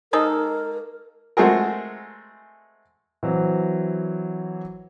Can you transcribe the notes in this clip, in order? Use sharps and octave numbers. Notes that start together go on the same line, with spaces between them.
G#3 D#4 A4 A#4
G#3 A3 C4 F#4 G#4 A#4
E3 F#3 C4